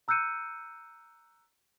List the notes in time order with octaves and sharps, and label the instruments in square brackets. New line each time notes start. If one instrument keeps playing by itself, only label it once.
[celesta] A#5 E6 F#6 G6 C#7 D#7